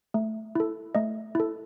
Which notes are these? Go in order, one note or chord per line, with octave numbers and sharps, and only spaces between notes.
A3
E4 A4
A3 D#5
E4 A4